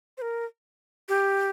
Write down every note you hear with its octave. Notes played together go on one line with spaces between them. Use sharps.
C5
A#4
G4